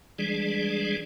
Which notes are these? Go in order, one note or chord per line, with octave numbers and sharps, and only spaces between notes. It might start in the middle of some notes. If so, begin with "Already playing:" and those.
E3 G3 G#3 D4 G#4 D5